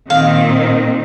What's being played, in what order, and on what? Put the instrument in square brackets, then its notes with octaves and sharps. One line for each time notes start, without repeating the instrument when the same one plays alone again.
[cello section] A#2 D#3 C4 [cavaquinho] F5